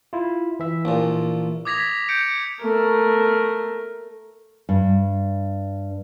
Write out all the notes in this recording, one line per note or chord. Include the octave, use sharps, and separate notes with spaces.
E4 F4
E3 E5
A#1 A#2
D6 D#6 G#6 A#6 B6 F7
G6 C#7 D7
A3 A#4
G2